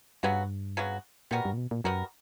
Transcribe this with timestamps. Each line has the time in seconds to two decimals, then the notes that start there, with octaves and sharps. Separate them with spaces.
0.23 G2 C#3 F#3 B3 F#4
0.77 C#3 F#3 B3 F#4
1.31 A#2 G3 B3 F#4 A#4
1.45 G2
1.53 A#2
1.58 B2
1.71 A#2
1.84 F#2 G3 B3 F#4 A#4